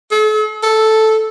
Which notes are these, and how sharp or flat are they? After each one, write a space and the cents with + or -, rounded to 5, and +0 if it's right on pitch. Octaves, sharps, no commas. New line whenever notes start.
A4 -45
A4 -5